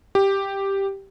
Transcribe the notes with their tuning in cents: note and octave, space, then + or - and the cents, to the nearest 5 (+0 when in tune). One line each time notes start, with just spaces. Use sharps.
G4 +0